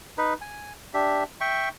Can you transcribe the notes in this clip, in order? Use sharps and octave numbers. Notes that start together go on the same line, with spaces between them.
D#4 B4
G#5
D4 G4 E5
E5 G5 C#6